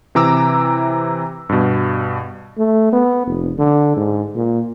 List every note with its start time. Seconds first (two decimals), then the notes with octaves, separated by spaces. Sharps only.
0.15 C3 E3 A#5 D6 E6
1.49 G2 B2
2.58 A3
2.93 B3
3.26 F1
3.58 D3
3.97 G#2
4.36 A#2